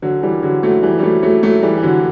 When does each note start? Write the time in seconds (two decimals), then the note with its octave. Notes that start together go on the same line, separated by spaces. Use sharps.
0.02 D3 F#3
0.23 E3 G3
0.43 D3 F#3
0.63 F#3 A3
0.83 E3 G3
0.99 G3
1.03 F#3 A3
1.23 F#3 A3
1.43 F#3 A3
1.63 E3 G3
1.78 E3
1.83 D3 F#3